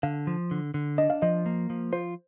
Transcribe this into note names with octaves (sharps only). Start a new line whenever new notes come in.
D3 F5
F3
D3
D3
D4 D#5
F5
F3 D#5
A#3
F3
F4 C5